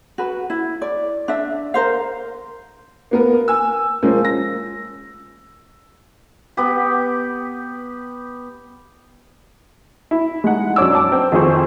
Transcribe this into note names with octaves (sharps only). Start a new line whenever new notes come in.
F#4 B4
E4
D5
D4 E5
A#4 C5 F5
A#3 B3 A#4
G#5 E6
F3 G#3 A#3 C#4 C5
A#6
B3 G4
E4
G#3 D#4 F#5
F#2 D4 C#5 D6 E6
A5 D6
C4
F2 D#3 F4 G#4 C5 C#6